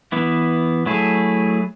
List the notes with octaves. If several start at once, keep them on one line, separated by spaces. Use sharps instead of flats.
E3 B3 E4
F#3 A3 E4 G#4